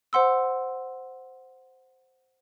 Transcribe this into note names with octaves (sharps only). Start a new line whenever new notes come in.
C5 F#5 C6 E6